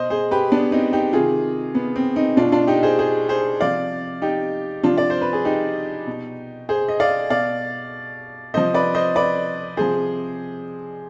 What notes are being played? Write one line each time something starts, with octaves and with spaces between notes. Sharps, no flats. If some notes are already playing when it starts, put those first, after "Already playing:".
Already playing: B2 C5 D#5
G#4 C5
G4 B4
B3 D4
C4 D#4
D#4 G4
C3 D#3 F4 G#4
B3
C4
C4 D#4
B2 D4 F4
D4 F4
D#4 G4
G#4 C5
G#4 C5
G#4 C5
C3 F3 D5 F5
D#4 G4
C3 F3 D4 F4
D5
C5
B4
G#4
D#4 G4
B2
G#4 C5
D#5
D5 F5
B2 D5 F5
C3 F3 C5 D#5
B4 D5
C5 D#5
B4 D5
C3 F3 G#4 C5